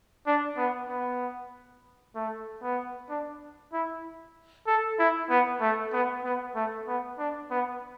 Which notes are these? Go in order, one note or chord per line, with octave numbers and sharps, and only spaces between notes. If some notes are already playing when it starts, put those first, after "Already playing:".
D4
B3
B3
A3
B3
D4
E4
A4
E4
B3
A3
B3
B3
A3
B3
D4
B3